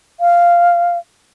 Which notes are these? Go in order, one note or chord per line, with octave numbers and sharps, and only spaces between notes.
F5